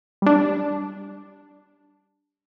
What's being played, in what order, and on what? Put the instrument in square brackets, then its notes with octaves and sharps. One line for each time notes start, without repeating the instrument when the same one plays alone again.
[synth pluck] G3 D4